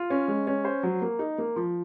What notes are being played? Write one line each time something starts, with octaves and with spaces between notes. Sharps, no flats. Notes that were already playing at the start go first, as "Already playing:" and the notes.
Already playing: F4
C#4
G#3
C#4
C5
F#3
A#3
D#4
A#3
F3